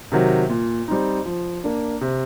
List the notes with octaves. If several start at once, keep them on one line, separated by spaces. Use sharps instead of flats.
C3 D#3 F#3
A#2
G3 C4 D#4
F3
A#3 D4
C3